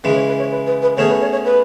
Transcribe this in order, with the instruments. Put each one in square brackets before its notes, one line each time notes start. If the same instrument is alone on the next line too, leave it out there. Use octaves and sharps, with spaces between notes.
[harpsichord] C#3 E3 G#3 [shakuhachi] B4
[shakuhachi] C#5
B4
C#5
B4
B4
B4
[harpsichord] B2 A3 C#4 G#4 [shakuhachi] C#5
[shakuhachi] B4
C#5
C#5
B4